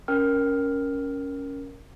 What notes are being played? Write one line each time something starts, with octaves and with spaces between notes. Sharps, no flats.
C#4 A#4 G5 F6